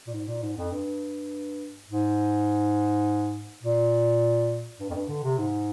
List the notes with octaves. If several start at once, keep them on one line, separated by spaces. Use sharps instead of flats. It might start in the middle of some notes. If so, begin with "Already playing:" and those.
A#2
G#2
A#2
G#2
F2
G2
G#2
A#2
G2
F2
G2
D3
C3
G#2